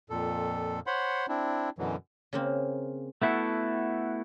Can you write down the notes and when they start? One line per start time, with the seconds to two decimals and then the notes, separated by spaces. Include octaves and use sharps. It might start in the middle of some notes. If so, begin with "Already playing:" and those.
0.10 F2 A#2 A4
0.87 C5 C#5 F#5 B5 C6
1.28 C4 D4 E4
1.79 F#2 B2 D3 E3 F#3
2.33 C#3 A#3 C4
3.22 A3 B3 E4 F#4 A4